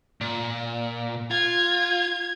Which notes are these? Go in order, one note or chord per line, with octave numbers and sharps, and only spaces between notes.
A#2
F4 G#6